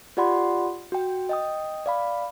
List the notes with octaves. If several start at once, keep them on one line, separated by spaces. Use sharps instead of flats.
F4 G4 D5 F#5 B5 C6
F#4 G5
D#5 G5 D#6
D5 F5 B5